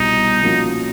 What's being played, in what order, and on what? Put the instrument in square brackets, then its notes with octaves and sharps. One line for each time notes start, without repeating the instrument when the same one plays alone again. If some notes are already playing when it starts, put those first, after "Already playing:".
Already playing: [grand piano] C2 B2 G3 [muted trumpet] D#4
[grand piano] A#2 F3 A#3 C#4 F#4